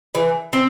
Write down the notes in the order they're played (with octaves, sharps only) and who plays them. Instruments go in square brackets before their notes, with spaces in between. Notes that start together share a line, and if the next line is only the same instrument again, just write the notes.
[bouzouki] E3
C4